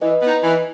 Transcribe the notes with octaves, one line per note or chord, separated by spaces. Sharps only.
E3 B4 D#5
B3 D#4
E3